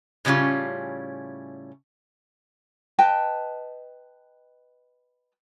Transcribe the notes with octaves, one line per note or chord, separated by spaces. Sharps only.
A2 C#3 G3 C#4 F4
B4 D#5 G5 A5